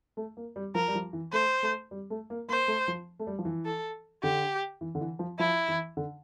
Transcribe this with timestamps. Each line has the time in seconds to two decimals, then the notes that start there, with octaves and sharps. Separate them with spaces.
0.17 A3
0.37 A#3
0.56 G3
0.75 F3 A#4
0.88 G3
0.95 F3
1.13 E3
1.33 A3 C5
1.63 A3
1.91 G3
2.10 A3
2.30 A#3
2.48 A#3 C5
2.68 A3
2.88 F3
3.19 A3
3.27 G3
3.39 F3
3.45 E3
3.66 A4
4.23 D3 G4
4.81 E3
4.95 D3
5.01 E3
5.19 F3
5.39 F3 E4
5.68 E3
5.97 D3